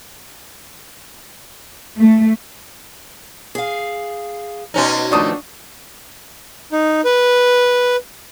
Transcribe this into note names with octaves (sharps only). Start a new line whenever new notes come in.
A3
G#4 F5
B2 C#4 D#4
D#3 F3 A3 D4 C#6 D#6
D#4
B4